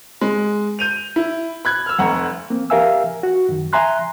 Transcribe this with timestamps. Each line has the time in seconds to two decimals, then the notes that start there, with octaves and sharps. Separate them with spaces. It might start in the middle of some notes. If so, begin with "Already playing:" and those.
0.21 G#3
0.79 G6 D#7 F7
1.16 E4
1.65 B5 F#6 G#6
1.86 E6 F6
1.98 F1 F2 F#5 A#5 C#6
2.50 A#3 C4
2.70 G4 A#4 E5 F5 G#5 E6
3.23 F#4
3.49 F#2 D#3
3.73 E5 G#5 A#5 C6 F#6